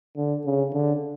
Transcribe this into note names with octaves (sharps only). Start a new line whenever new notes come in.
D3
C#3
D3